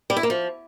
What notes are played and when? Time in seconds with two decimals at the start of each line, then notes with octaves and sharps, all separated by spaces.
0.10 G3
0.17 E4
0.23 A#3
0.30 F3